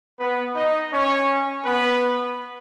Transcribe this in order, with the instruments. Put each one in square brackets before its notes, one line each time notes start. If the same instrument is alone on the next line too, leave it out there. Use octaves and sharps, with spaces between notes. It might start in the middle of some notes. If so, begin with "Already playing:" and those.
[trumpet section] B3 B4
D#4 D#5
C#4 C#5
B3 B4